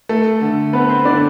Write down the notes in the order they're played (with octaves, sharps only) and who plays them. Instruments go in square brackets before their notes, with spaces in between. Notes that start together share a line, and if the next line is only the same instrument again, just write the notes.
[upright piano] A3 A4
D3
B3 C4 B4
C4 C5
D3 D4 D5